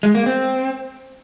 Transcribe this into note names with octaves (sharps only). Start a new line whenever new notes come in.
G#3
A#3
C4